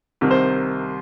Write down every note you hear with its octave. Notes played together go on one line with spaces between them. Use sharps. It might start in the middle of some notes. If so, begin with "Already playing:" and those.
C2 C3 D#3
C5